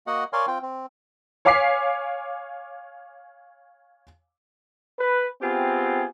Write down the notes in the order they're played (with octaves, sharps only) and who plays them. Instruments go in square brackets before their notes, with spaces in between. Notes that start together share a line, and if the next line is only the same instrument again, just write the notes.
[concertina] A#3 F#4 D#5 F#5
A#4 C#5 D5 F5 G#5 C6
C4 F4 G5
C4
[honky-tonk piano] C#5 F5 G#5 D6 B6 C7
[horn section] B4
B3 C4 F4 G4 G#4